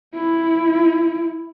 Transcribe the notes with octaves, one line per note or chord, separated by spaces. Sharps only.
E4